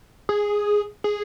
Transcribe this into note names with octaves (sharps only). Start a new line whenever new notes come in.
G#4
G#4